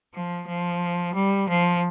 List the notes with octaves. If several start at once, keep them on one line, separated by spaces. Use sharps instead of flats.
F3
F3
G3
F3